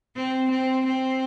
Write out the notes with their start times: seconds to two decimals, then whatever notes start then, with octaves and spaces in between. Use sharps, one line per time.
0.15 C4
0.50 C4
0.86 C4